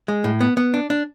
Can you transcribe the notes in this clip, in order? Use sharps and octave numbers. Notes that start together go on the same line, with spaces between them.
G#3
A2
B3
B3
D4
D4